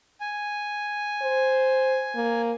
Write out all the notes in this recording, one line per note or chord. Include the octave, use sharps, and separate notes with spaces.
G#5
C5
A#3